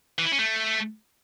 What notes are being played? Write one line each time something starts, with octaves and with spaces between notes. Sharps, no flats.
E3
E4
C#4
A3